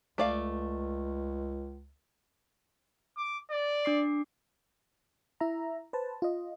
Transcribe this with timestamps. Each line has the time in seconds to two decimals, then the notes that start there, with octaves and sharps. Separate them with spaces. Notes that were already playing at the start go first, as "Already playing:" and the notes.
0.18 C#2 A3 D5 F5
3.17 D6
3.51 D5
3.85 D4 D6 C7
5.40 E4 E5 A#5
5.93 B4 C5 A5
6.22 F4 D#5